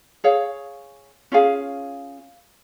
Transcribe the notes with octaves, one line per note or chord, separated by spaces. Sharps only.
G#4 C#5 F5
C#4 F4 G#4 F5